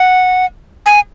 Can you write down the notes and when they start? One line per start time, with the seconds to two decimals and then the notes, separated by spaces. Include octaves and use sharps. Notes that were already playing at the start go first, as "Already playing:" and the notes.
Already playing: F#5
0.86 G#5